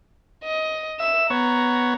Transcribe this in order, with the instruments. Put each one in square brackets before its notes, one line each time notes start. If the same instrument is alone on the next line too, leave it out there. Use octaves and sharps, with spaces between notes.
[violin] D#5
[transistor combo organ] E5 [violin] E7
[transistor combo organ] B3 C#5 [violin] A#5